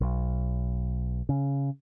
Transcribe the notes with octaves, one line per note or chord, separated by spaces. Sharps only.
B1
C#3